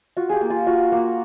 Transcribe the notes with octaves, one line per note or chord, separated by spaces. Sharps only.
F4 F#4
G4 G#4
A#3
F4
F4 F#4
A#3